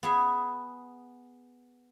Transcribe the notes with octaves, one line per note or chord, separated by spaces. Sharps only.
B3 G#4 E5